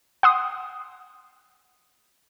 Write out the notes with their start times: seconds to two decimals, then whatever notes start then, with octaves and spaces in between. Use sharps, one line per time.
0.23 F#5 C6 D#6